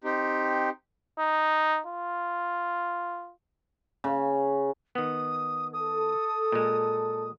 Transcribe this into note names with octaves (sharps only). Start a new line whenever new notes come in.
C4 D#4 G4
D#4
F4
C#3
D#3 B3 D#6
A4 D#6
A#2 G#3